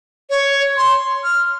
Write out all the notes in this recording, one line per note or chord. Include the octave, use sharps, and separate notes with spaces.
C#5
C6
F6